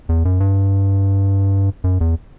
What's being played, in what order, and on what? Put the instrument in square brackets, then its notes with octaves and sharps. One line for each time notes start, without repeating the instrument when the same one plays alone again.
[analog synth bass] E2
F#2
G2
F#2
E2